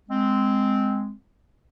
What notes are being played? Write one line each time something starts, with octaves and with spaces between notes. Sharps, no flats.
G#3 C4